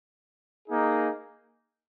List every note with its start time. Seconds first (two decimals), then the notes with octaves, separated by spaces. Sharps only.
0.69 A#3 D#4 G#4